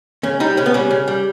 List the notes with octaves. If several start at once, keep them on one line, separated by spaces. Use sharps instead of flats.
C#3 C#4
G3 D#4
C#3 C#4
B3
G3 C#4
C#3
G3